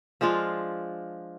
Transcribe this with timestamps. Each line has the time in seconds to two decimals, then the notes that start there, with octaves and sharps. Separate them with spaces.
0.21 F3 G#3 D4 F4